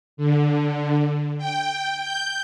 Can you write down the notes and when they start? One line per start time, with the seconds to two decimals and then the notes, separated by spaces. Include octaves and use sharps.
0.17 D3
1.38 G5
1.97 G6